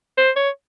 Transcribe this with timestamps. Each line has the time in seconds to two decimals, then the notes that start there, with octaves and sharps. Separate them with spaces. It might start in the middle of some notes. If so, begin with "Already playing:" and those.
0.17 C5
0.36 C#5